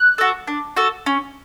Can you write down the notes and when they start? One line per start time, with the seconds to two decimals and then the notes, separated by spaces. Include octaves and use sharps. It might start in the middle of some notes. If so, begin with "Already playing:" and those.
Already playing: F#6
0.18 F#4 A4
0.47 D4
0.77 F#4 A4
1.06 C#4